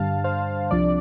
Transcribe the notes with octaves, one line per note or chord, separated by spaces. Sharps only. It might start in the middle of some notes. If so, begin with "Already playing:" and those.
Already playing: G2 D3 G3 F5 A5
C5 F5
C2 C3 F3 D4 D5